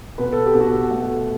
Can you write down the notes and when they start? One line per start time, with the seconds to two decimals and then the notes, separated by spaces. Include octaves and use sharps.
0.18 B2 B4
0.32 A4
0.46 G4
0.55 B2
0.60 F#4 A4
0.91 A3